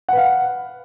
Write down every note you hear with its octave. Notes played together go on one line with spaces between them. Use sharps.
B4 F5 F#5